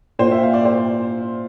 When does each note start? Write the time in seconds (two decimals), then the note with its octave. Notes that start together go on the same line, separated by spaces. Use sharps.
0.19 A#2 C5
0.31 E5
0.43 F5
0.54 D5
0.65 C5